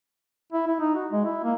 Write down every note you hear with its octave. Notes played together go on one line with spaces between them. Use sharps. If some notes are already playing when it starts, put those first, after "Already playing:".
E4
E4
D#4
F#4
G#3
E4
A#3